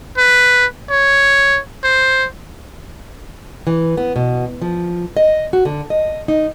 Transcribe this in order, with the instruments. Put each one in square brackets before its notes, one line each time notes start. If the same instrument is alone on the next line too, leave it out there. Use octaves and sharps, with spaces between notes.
[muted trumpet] B4
C#5
C5
[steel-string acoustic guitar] E3
B3
B2
F3
D#5
F#4
D3
D#5
D#4